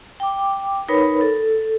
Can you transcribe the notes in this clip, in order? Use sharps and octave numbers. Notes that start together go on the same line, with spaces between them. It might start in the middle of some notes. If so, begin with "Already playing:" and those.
G5 D6
D#4 A#4 B4 C#5 B5
A4